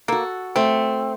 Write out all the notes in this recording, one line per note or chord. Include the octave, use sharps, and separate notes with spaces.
A#3 F#4 A4
A3 C4